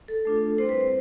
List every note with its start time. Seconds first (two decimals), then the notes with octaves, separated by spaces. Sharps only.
0.08 A4
0.25 A3 D4 F4
0.58 G3 C4 E4 C5
0.69 B4
0.81 C5